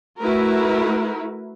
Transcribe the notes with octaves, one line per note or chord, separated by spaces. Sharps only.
A3 E4 F#4 A#4 B4